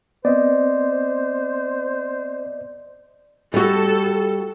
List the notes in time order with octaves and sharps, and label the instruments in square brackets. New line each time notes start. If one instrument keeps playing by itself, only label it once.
[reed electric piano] B3 C4 [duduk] C5 [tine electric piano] D5 D#5
[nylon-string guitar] G3 F#4 [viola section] A4